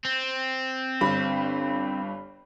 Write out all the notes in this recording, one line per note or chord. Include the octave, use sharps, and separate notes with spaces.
C4
G1 G2 B5